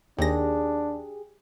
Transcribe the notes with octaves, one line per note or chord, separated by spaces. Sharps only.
D#2 D4 G4 G#4 A#6